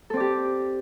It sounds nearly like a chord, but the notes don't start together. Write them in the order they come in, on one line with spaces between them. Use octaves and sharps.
A4 C4 D5 G4